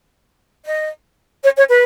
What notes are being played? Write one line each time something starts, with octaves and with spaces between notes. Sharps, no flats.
D#5
C#5
C#5
B4